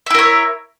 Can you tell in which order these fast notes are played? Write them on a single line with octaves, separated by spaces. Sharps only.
E5 E4 A#4 C#5